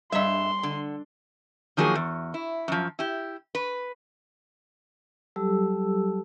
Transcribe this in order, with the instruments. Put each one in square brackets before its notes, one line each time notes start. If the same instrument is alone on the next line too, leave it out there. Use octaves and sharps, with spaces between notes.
[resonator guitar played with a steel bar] G2 E5 [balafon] G3 D#5 [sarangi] C6
[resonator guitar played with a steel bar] D3
D#3 F3 F#3 A#3 G#4
E2
E4
F#2 F3
E4 G4
B4
[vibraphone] F#3 G3 G4 A4 A5 E6